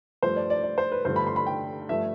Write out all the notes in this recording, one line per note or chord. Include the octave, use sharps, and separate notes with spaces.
G2 F3 A3 C5
D5
D5
D5
C5
B4
G2 D3 F3 A3 C5
B5
C6
B5
G5
G2 F3 A3 E5